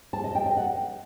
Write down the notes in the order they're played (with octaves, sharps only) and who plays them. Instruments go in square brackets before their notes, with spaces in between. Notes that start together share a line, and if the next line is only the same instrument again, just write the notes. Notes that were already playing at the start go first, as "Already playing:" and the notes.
[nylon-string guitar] A5
D#5
G5
D#5
F#5